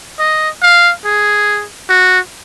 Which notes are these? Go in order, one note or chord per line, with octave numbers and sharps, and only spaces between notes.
D#5
F5
G#4
F#4